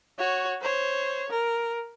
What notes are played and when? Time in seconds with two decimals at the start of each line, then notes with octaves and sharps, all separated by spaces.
0.19 F#4 C#5
0.61 C5 C#5
1.30 A#4